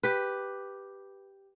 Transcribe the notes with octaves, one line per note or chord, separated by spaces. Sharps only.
G4 B4